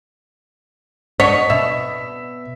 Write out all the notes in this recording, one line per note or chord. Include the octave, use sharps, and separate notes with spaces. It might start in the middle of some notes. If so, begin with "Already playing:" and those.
D4 F#4 C#5 D#5 B6
B2 E5